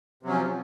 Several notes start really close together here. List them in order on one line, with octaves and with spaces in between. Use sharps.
C3 F#3 C#4 F3